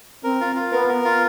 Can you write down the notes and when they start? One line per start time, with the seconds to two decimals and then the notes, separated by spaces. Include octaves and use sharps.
0.24 C4 A#4
0.41 F4
0.56 F4
0.72 B3 A#4
0.88 A#4
1.05 F4